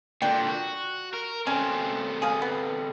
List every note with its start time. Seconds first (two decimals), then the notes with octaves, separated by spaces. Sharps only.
0.22 A#2 D3 D4 G5
0.48 F#4
1.13 A#4
1.47 D3 C4 C#4
2.22 G#4 F5
2.42 B3